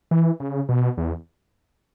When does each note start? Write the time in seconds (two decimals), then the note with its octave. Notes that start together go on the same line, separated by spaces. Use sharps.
0.11 E3
0.40 C#3
0.69 B2
0.98 E2